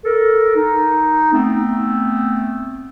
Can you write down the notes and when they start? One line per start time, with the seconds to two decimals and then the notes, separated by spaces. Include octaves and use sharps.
0.04 A4 A#4
0.56 D#4
1.33 A3 B3 C4